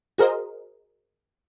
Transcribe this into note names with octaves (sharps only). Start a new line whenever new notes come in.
F#4 G#4 A#4 C5 D#5